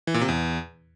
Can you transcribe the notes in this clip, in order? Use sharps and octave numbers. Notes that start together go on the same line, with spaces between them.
E3
A#2
C3
E2